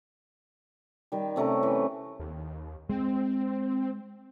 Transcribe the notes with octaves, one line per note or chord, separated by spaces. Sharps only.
D#3 G3
C3 A3 C#4 A#4
E3
D#2
G#3 C4